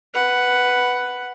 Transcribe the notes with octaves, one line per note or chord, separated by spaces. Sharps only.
B4 F#5